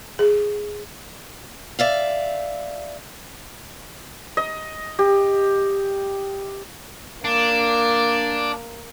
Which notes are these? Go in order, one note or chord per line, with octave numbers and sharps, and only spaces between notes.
G#4
D5 E5 F5
D#5
G4
A#3 D4